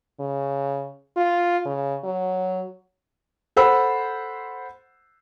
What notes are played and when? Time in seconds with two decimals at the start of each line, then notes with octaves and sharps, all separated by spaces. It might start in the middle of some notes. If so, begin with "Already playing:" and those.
0.20 C#3
1.17 F4
1.66 C#3
2.04 F#3
3.56 A4 C5 F#5 B5 E6